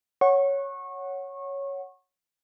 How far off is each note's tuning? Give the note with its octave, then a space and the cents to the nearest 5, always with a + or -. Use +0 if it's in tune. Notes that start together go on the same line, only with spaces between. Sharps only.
C#5 +0 F#5 +0 C#6 -25